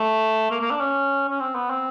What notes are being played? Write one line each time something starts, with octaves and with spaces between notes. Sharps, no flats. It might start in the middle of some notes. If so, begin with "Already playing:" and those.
Already playing: A3
A#3
A#3
D4
C#4
C#4
C4
B3
C4